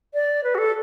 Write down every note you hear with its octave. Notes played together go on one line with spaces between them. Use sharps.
D5
B4
F#4
A4